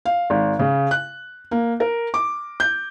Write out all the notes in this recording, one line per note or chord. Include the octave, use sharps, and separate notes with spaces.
F5
G#1
C#3
F#6
A#3
A#4
D6
G6